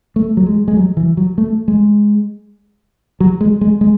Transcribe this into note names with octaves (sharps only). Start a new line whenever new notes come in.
A3
F#3
G#3
G#3
F#3
E3
F#3
A3
G#3
F#3
G#3
G#3
G#3